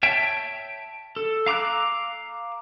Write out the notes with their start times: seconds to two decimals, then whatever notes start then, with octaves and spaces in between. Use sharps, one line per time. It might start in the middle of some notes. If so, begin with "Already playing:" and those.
0.03 C#5 E5 G5 A5
1.16 A4
1.46 F5 A#5 D6 E6 F#6